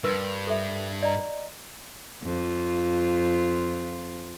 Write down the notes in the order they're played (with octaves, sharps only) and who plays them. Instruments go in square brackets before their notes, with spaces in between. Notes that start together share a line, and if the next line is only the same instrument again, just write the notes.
[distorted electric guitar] G2 [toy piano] A#4 B4 C6
[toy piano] A4 E5
D5 D#5 A#5
[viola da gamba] F2 F4